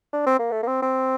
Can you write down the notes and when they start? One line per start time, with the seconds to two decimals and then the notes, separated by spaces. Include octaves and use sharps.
0.13 D4
0.26 C4
0.39 A#3
0.51 A3
0.63 A#3
0.67 C4
0.82 C4